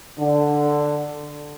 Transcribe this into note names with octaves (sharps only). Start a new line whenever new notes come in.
D3